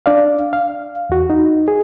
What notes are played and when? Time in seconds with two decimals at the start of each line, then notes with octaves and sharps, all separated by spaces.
0.06 D4 D5 F5
0.53 F5
1.10 E2 F#4
1.30 D#4
1.68 G#4